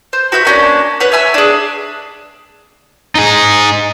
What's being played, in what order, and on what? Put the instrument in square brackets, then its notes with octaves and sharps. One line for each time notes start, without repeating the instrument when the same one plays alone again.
[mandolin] C5
F#4 B4 E5 G6
A#3 C#4 D4
B4 C#5 F#5 F#6
C#5 E5 G#5 E6
D4 G#4
[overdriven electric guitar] D#4 G#4